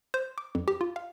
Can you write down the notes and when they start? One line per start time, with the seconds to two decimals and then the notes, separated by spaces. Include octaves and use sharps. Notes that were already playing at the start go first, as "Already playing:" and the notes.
0.14 C5
0.38 D6
0.55 F2
0.68 G4
0.81 F4
0.96 F5